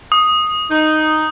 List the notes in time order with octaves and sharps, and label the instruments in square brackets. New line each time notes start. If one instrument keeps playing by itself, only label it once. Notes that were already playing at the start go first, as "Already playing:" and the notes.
[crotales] D#6
[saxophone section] D#4